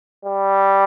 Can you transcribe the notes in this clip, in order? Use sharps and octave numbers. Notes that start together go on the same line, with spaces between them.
G3